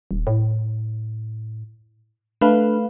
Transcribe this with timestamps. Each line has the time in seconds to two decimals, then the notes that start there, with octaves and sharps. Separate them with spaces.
0.11 D#1
0.27 A2
2.41 A3 D4 B4 F5